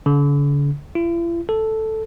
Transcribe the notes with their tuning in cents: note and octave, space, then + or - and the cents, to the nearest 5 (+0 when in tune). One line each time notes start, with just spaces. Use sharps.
D3 -45
E4 +45
A4 +0